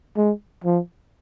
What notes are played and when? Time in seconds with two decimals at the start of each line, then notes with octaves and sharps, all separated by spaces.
0.17 G#3
0.64 F3